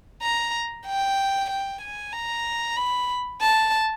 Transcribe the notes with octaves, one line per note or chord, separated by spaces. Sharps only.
A#5
G5
G5
G#5
A#5
B5
A5